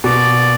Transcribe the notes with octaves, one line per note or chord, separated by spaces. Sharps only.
B2 D5